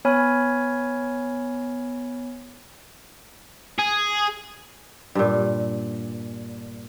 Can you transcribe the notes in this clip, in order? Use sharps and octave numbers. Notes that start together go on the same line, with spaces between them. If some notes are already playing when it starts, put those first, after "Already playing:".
B3 C#5 G#5 B5 F6
G#4
G2 A#2